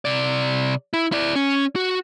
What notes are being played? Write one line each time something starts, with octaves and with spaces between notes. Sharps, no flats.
C3 D5
E4
E4 D5
C#4
F#4